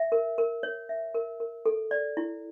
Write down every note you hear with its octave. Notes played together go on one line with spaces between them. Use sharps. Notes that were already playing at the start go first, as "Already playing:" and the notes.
Already playing: E5
A#4
A#4
C#5
E5
A#4
A#4
A4
D5
E4